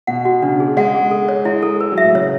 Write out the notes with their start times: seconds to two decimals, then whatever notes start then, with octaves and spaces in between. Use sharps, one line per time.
0.07 B2 F#5
0.25 F#4
0.42 C#3 D4
0.60 G#4
0.77 G#3 F#5
0.94 G#4
1.11 A4
1.28 C#5
1.45 G#3 E4
1.63 A4
1.81 B4
1.92 F#3
1.98 E5
2.03 A2
2.15 C#3 C#5